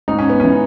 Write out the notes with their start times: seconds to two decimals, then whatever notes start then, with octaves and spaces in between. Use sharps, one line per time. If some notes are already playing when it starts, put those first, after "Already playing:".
0.08 G#2 D#4
0.19 C#4
0.30 B3
0.40 E3 C#4